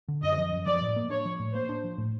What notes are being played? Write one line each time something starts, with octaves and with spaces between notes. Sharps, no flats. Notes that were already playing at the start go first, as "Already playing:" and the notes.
D3
F#2 D#5
F3
F#2
F3 D5
A2
A#3
D4 C#5
F3
A2
A#3 C5
D4
F3
A2